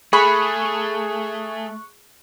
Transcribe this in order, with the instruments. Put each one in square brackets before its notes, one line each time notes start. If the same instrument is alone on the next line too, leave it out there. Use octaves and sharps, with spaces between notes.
[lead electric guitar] A3 [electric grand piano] G#4 [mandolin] B5 [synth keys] C#6 F#6